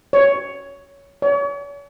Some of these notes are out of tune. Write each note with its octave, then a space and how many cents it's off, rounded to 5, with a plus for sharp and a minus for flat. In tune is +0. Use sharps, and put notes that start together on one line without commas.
C#5 +15
C#5 +45